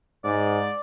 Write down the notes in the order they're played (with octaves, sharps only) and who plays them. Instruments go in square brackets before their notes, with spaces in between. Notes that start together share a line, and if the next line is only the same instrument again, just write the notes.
[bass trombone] G#2 [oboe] D5